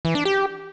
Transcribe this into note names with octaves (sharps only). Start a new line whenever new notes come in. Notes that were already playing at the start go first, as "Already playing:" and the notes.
E3
D4
G4